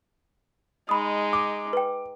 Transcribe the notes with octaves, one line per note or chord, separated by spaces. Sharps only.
G#3 D#4 B5 D#6
D6
B4 G5